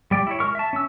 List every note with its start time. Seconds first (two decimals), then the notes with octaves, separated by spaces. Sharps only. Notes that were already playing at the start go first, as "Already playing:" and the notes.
0.11 G3 D5 G5
0.27 E4 C#5
0.40 G#3 A#4 C#6 F6
0.55 E5 A5
0.73 C#4 E6